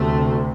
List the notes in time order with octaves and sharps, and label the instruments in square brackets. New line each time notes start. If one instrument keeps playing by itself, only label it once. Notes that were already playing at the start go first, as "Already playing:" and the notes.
Already playing: [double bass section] D2 C3 A3